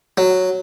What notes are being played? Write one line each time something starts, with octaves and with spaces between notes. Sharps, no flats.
F#3